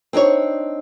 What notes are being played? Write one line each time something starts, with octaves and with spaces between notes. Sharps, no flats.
C4 D4 D#4 C#5